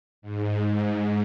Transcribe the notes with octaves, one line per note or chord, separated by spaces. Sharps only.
G#2